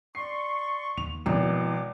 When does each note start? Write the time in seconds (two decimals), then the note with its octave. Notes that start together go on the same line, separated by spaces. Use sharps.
0.15 D5 C6 C#6 C7
0.97 D#2 F7
1.26 G#1 B2 F3 E4 B4 D#5 D6